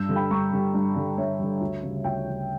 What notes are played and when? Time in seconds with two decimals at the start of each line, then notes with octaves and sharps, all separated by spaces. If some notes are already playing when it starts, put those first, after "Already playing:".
Already playing: G2 E6 G6
0.09 D3 G3
0.16 G5 B5
0.30 G2 A#5 C#6
0.53 D3 G3
0.74 G2
0.96 D3 G3
1.18 G2 C#5 E5
1.39 D3 G3
1.61 D2
1.83 C#3 G3
2.04 D2 E5 G5
2.27 C#3 G3